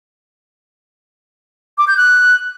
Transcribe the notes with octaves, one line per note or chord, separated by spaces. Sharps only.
D6
G6
F#6